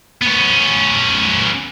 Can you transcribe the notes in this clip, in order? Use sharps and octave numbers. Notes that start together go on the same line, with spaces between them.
B3 C#4